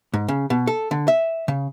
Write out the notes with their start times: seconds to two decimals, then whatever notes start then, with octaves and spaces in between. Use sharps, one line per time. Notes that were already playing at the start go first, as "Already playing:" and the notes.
0.14 G#2
0.28 C#3
0.50 B2
0.67 A4
0.91 D3
1.08 E5
1.48 C#3